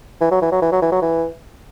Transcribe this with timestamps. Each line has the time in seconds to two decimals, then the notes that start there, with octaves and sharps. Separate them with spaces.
0.21 E3
0.31 F#3
0.42 E3
0.52 F#3
0.62 E3
0.72 F#3
0.82 E3
0.92 F#3
1.02 E3